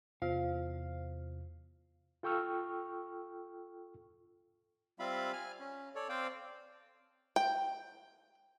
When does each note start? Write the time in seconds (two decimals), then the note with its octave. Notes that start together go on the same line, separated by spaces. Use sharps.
0.22 E2 C3 F4 C5 F5 F6
2.23 F4 A4 G5 C#6 E6 F6
4.99 G3 C4 F4 E5 F5 B5
5.33 G#5 F6
5.60 C#4
5.95 A4 C#5 D5
6.09 C4 C5 D5 F5 G5
7.36 G5